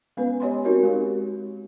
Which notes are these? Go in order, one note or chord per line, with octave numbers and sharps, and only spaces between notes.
G#3 B3 C#4 B4
G4 C#5 D#5 G#5 B5 C6
C4 D#4 F#4 A#4 C#5
G#3 G4